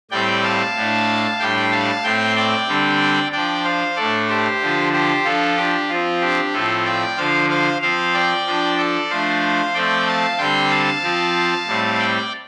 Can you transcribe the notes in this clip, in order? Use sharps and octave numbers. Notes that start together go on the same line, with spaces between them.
A2 G3 C4 D5 G5
F5 A5
A2 A3 D4
A2 G3 D4 G5 C6
F5 A5
A2 A3 C4 G5 C6
D5 G5
D3 G3 C4
F3 D4 D5 G5
C5 F5
A2 A3 D4 A4 D5
G4 C5
D3 F3 D4
G4 C5
F3 D4 F4 A4
D4 G4
F3 C4 F4
D4 G4
A2 F3 C4 F4 A4
D5 G5
D3 F3 D4 C5 F5
C5 F5
F3 C4 C5 F5
D5 G5
F3 D4
A4 D5
F3 A3 D4 C5 F5
F3 A3 C4 D5 G5
F5 A5
D3 G3 C4 G5 C6
F5 A5
F3 C4
A2 G3 C4
D5 G5